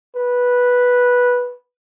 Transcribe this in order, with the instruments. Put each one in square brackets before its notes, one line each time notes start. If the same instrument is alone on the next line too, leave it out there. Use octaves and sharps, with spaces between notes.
[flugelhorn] B4